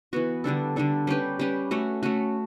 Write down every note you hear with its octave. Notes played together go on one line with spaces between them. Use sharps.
E3 B3 F#4
D3 G3 D4 A4
D3 G3 D4 A4
G3 C#4 G4 B4
G3 C#4 G4 B4
A3 C#4 F#4
A3 C#4 F#4